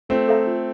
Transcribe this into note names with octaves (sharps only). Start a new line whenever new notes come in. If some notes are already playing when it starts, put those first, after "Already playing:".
A3 C4 F4
A4 E5 A#5
F4